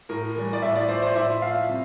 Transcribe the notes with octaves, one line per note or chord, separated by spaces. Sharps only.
A2 A#4
E3 G3
D5
A2 E5
D5
F3 C5
C5
A2 E5
F3 F5
C3